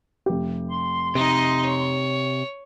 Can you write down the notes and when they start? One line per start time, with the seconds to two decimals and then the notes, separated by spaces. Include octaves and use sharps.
0.26 F1 G4
0.69 C6
1.15 C3 D#4 D#5
1.66 C#5